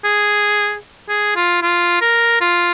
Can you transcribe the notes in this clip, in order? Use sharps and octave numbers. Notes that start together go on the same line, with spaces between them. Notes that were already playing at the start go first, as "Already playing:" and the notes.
G#4
G#4
F4
F4
A#4
F4